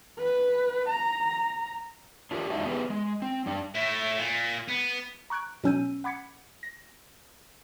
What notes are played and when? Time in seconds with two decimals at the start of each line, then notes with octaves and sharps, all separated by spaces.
0.18 B4
0.89 A#5
2.31 D4 F4 G4 A#4
2.50 G#3 D4 D#4 F4 F#4 E5
2.65 B3 G4 G#4 B4
2.90 G#3
3.22 C4
3.46 G3 D4 D5
3.75 A3 E4
4.18 A#2
4.68 B3
5.30 A#5 C#6 F#6 G#6 D7
5.64 B2 F#3 C#4 E6 G6 D#7
6.04 F#5 B5 D6 G#6 B6 C#7
6.63 A#6